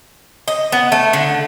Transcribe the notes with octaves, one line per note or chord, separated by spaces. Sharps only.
D#5
B3
A3
D3